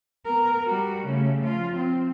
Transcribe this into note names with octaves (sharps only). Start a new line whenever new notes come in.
B3 A#4
G3 F#4
C#3 A3
F3 F4
C4